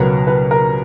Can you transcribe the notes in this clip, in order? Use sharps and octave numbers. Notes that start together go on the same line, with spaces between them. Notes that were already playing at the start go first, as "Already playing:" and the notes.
Already playing: C#2 B2 F#3 B3 A#4
B4
A#4